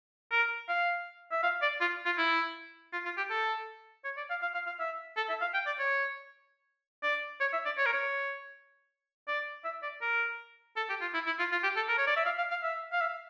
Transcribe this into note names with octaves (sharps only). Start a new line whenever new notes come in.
A#4
F5
E5
F5
D5
F4
F4
E4
F4
F4
G4
A4
C#5
D5
F5
F5
F5
F5
E5
A4
E5
F5
G5
D5
C#5
D5
C#5
E5
D5
C#5
A#4
C#5
D5
E5
D5
A#4
A4
G4
F4
E4
E4
F4
F4
G4
A4
A#4
C#5
D5
E5
F5
F5
F5
E5
F5
E5